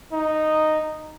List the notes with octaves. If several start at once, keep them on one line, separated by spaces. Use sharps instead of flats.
D#4